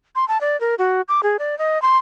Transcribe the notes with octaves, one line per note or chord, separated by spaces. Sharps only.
C6
A5
D5
A#4
F#4
D6
G#4
D5
D#5
C6